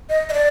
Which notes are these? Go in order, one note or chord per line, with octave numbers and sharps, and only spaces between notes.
D#5
D#5
D5